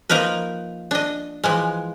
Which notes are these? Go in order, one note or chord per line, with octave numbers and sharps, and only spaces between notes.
F3 A#3 D#4 A#4 B4
D4 D#5
E3 F3 G#3